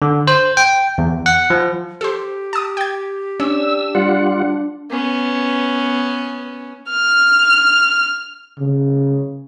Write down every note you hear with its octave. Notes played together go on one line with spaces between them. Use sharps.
D3
C5
G5
E2
F#5
F3
G4 A4 C5
A5 D#6
G5 G#6
C#4 D4 E6
G3 F4 F#5
B3 C#4
F6
C#3